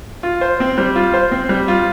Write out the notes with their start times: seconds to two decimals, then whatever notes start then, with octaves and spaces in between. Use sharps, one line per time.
0.23 F4
0.41 C5
0.60 C4
0.78 G3
0.96 F4
1.14 C5
1.32 C4
1.49 G3
1.68 F4